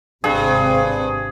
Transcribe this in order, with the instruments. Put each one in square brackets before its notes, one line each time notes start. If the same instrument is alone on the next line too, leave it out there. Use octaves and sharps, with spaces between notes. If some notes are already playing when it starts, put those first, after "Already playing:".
[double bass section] G#1 C3 C4 [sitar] G2 [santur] G#4